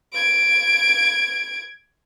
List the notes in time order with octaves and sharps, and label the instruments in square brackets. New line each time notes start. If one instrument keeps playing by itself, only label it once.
[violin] G#6 D7